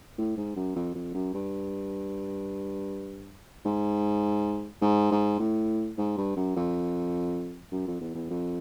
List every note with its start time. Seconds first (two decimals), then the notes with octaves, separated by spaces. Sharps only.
0.18 A2
0.37 G#2
0.56 F#2
0.75 F2
0.95 F2
1.14 F#2
1.34 G2
3.65 G#2
4.82 G#2
5.11 G#2
5.39 A2
5.98 G#2
6.17 G2
6.36 F#2
6.56 F2
7.72 F#2
7.87 F2
8.01 E2
8.15 E2
8.30 F2